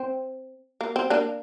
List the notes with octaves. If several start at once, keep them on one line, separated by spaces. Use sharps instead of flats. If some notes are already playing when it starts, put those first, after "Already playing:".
Already playing: C4
A#3
C4
A#3 D4